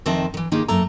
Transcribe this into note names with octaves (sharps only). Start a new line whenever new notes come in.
F2 D#3 C4 D#5 E5 A5
D#3 E3
D#3 A#3 D#4 F4 G4 G#4
F#2 A3 A#3 A4 A#5